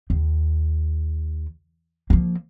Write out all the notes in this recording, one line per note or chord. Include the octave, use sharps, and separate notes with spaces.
D#2
F3 A#3